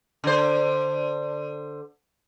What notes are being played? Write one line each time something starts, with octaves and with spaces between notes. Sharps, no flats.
D3 C5